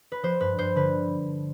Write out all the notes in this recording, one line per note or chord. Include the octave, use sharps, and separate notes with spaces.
B4
F3 C5
G2 B4
G2 C5
D3 B4